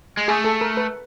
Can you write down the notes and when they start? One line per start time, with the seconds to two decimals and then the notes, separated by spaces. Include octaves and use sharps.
0.17 G#3
0.28 A3 G#4
0.44 A4
0.61 A#4
0.77 B4